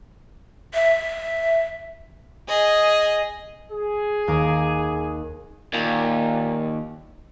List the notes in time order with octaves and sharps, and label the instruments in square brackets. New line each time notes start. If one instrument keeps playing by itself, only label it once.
[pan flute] E5
[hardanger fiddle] G#4 D#5
[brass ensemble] G#4
[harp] D#2 A#4 D6
[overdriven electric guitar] D#2 [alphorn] A#2